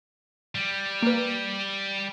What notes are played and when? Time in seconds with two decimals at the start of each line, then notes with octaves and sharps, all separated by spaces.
0.55 G3
1.02 A#3 B4